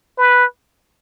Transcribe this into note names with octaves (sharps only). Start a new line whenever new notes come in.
B4